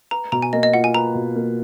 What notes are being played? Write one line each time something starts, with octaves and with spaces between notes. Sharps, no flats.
B4 A#5
B2 A#5
G#5
A#3 D#5
D#5
F4 F#5
G#5
B4 A#5
B2
A#3